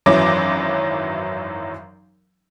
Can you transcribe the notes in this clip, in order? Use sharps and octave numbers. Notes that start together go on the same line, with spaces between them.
G#1 F#2 E3 F#3 D6